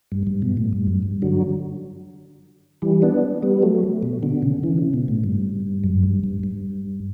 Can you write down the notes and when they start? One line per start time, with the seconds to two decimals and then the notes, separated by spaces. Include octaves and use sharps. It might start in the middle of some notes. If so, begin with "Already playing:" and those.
0.12 G2
0.27 G2
0.42 B2
0.57 A2
0.73 G2
0.87 F#2
1.02 G2
1.22 D3 F#3
2.82 E3 G3
3.02 B3 D4
3.42 G3 B3
3.62 F#3 A3
4.03 B2
4.22 B2 D3
4.42 C#3
4.63 C#3 E3
4.78 C#3
4.93 B2
5.08 A2
5.24 G2
5.84 F#2
6.03 G2
6.24 G2
6.43 G2